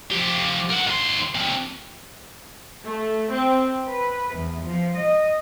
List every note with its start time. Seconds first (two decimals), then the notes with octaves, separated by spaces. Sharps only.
0.12 F3 G4
0.70 A#4 F#5
0.87 D#2 C6
1.35 C4 D4
2.85 A3
3.30 C4
3.89 B4
4.35 E2
4.64 F3
4.96 D#5